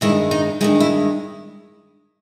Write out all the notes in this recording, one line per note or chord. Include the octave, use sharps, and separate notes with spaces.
G2 D#3 G#3 E4
D#4
G2 D#3 G#3 E4
E4